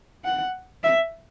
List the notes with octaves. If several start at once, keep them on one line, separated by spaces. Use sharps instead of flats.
F#5
E5